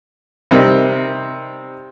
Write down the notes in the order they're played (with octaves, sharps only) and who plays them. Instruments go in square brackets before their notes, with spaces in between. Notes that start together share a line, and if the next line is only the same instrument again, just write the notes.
[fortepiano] C3 G3 C4 D#4 A#4